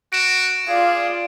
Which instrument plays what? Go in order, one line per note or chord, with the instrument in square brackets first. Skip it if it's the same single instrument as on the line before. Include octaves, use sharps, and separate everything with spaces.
[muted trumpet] F#4 [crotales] D7 E7
[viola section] F4 D5 [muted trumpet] G#4 [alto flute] F5